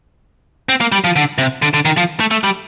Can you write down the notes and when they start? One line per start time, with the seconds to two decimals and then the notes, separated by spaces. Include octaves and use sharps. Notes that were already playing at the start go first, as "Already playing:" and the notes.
0.69 C4
0.81 A#3
0.92 G3
1.04 F3
1.16 D3
1.38 C3
1.62 D3
1.74 D3
1.85 D#3
1.97 F3
2.20 A3
2.31 A3
2.44 G3